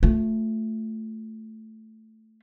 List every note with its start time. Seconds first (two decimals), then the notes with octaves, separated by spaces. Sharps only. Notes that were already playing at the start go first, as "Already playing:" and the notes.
0.03 A3 F4